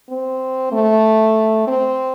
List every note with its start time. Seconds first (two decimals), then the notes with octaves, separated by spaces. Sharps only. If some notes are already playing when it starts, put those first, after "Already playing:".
0.09 C4
0.72 A3
1.67 C4